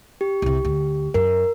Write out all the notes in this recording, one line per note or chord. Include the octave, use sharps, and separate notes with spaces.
G4
C2 C3
D2
F#2 A#4